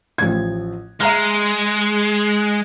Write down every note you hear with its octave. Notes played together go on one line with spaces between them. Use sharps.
A1 F3 G#6
G#3 E5 A#5 F6